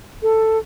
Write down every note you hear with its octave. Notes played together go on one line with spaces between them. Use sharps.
A4